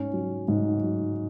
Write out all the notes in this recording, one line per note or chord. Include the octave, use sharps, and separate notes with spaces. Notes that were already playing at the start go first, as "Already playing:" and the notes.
Already playing: G#2 C#4
F#3
G#2
F#3